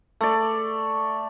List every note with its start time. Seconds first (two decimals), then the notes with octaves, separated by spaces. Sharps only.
0.21 A3 D5